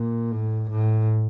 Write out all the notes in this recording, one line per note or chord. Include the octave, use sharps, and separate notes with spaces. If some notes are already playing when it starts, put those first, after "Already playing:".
Already playing: A#2
A2
A2